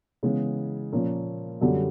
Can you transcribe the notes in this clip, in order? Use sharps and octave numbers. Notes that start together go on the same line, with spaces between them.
C#3 E3 G#3 B3
A#2 F3 A#3 C#4
F#2 D3 G3